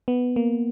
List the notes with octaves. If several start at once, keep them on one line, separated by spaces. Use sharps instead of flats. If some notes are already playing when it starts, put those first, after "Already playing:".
B3
A#3